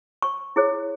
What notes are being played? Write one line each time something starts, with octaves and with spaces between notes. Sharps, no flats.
C#6
E4 G#4 C#5